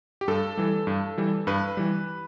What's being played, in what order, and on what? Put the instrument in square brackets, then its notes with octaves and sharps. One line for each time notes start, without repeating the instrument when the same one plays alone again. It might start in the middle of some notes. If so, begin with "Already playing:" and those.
[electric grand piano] G4
G2 A4
E3 G3
G2
E3 G3
G2 B4
E3 G3